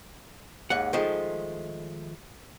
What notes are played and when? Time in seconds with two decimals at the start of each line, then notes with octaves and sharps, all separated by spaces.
0.70 D#2 G#2 F#5
0.93 D#3 F3 G#3 A3